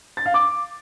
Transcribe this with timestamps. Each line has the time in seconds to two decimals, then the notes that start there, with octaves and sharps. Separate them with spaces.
0.17 A6
0.26 F5
0.34 D6